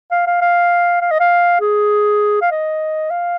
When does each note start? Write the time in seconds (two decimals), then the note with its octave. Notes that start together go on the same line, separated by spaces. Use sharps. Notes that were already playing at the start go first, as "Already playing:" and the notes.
0.11 F5
0.27 F5
0.41 F5
1.01 F5
1.11 D#5
1.20 F5
1.61 G#4
2.42 F5
2.51 D#5
3.11 F5